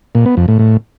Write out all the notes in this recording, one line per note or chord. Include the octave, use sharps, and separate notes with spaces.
A#2
B3
F2
A2
A2